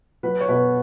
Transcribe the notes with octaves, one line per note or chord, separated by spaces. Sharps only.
F#3 B4
C#5
B2 B4